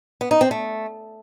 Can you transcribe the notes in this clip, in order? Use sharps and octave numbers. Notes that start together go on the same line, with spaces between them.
B3
D#4
C4
A3